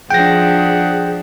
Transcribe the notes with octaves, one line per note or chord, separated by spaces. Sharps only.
F3 D4 G#4 F#5 G5 A#6